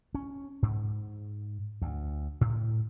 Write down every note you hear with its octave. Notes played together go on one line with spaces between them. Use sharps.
C#4
G#2
D2
A2